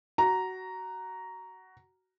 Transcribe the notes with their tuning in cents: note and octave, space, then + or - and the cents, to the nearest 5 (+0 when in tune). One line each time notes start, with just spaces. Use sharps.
F#4 +15 A#5 +0